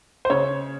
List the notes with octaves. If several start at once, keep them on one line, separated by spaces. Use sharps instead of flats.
C5
C#3 C#5